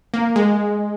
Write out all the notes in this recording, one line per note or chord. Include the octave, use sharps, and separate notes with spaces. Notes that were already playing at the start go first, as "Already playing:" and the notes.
A#3
G#3